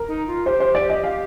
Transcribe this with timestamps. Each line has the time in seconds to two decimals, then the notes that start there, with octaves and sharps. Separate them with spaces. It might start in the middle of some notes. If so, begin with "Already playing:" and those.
Already playing: A#4
0.08 D#4
0.27 F4
0.46 G4 C5
0.60 C5
0.75 D5
0.90 D#5
1.04 F5